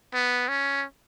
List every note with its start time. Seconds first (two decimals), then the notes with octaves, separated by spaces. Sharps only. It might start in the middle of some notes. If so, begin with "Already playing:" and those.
0.13 B3
0.48 C#4